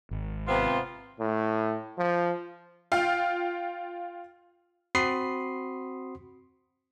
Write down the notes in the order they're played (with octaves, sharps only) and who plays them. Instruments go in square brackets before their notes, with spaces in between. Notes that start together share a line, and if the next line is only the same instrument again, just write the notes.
[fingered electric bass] G#1
[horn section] C3 B3 C4 [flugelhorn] F4
[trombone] A2
F3
[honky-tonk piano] F4 F5 G5
[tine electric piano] C4 F#4 B5 C6 D#6 C7